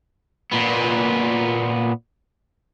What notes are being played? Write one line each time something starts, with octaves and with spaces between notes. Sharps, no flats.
A#2 B3